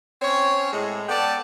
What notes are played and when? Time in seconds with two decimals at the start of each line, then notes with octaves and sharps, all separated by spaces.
0.22 C4 C#4 C#5
0.73 A2 G#3
1.09 B3 A4 D5 G5 A5